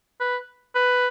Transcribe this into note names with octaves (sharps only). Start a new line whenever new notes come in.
B4
B4